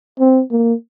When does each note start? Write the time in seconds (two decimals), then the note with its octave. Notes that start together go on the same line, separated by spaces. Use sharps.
0.19 C4
0.51 A#3